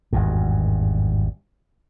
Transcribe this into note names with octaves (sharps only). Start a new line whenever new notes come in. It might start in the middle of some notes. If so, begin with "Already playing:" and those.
G#1 E2 G2